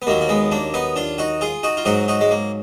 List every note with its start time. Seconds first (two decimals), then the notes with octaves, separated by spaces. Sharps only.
0.02 B3
0.07 D#2 D#3 F#3 A#3
0.21 A#3
0.29 G#3 B3
0.51 A#3 D4
0.74 B3 D#4
0.96 D4 F4
1.18 D#4 F#4
1.41 F4 G#4
1.63 D#4 F#4
1.77 F4
1.85 G#2 F#3 D#4 F#4
2.08 D#4 F#4
2.21 G#3
2.31 A#3